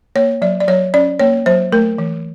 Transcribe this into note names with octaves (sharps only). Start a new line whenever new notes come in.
A#3 C#5
F#3 D5
D5
F#3 C#5
C#4 D5
A#3 C#5
F#3 C5
A3 A#4
E3